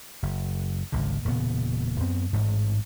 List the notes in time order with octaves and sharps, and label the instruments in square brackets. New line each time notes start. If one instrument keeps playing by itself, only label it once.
[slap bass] F#1
G#1 C#2 D3
E1 A#2 C#3 B3
F#2 B3 C4
A1 G#2